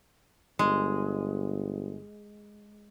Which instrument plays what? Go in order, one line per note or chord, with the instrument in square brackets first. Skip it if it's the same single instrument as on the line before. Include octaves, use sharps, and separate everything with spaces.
[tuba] G1 [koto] G#3